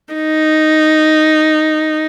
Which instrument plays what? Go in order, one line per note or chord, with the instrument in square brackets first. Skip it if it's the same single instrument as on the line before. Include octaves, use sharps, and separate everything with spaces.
[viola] D#4